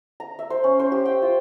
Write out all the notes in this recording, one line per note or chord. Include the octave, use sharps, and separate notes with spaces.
A#5
E5
C5
C#4
C5
G4
G5
F4